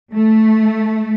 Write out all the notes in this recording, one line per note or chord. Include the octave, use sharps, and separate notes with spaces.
A3